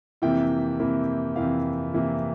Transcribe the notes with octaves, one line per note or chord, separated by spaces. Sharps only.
F2 C3 E3 A#3 E4 G5
F2 C3 E3 A#3 E4
F2 C3 E3 A#3 E4 F5
F2 C3 E3 A#3 E4